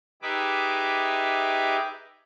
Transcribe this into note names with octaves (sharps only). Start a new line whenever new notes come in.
D#4 G4 G#4 B4 E5 D6